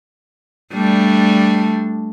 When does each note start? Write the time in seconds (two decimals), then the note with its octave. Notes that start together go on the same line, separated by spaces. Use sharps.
0.73 G3 A3 D4